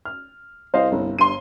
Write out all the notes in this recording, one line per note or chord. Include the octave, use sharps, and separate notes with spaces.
F6
C2 C5 D#5 F5
G1
G2 C6 D#7